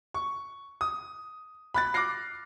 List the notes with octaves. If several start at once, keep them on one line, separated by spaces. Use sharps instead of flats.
C#6
D#6
B5 F#6 A6
D6 F6 F#6 A#6 C7